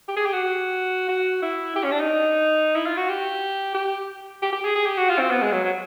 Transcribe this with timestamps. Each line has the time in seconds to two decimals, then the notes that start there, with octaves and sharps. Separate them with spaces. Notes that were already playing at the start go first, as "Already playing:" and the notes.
0.09 G4
0.17 G#4
0.26 G4
0.33 F#4
1.08 F#4
1.42 E4
1.76 G4
1.84 C#4
1.91 D4
2.00 D#4
2.76 E4
2.86 F4
2.97 F#4
3.09 G4
3.74 G4
4.42 G4
4.53 G4
4.64 G#4
4.75 G#4
4.86 G4
4.98 F#4
5.09 F4
5.19 C4
5.30 B3
5.42 G#3
5.52 F#3
5.64 F#3